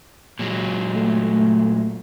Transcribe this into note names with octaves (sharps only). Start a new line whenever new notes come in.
A#2 F#3 G#3
A3